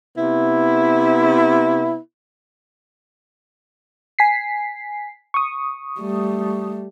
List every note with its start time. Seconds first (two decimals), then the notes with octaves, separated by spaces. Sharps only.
0.17 C3 B3 E4
4.19 G#5 B6 C7
5.34 C#6 D#6
6.00 G3 A3